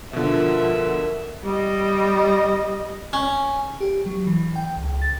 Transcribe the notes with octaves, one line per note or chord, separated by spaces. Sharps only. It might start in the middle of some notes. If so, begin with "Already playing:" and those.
B2 D3 F3 A#4 E5
G3 D#5
C#4
G4
F#3
E3
G5
C#2
A6